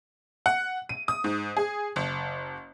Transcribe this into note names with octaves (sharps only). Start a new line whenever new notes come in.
F#5
D#7
D#6
G#2
G#4
F#1